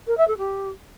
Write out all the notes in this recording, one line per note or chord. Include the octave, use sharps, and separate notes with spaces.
A#4
E5
A4
G4